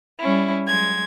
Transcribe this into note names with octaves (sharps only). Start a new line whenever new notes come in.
G3 C#4 E4
F#3 G#3 G#6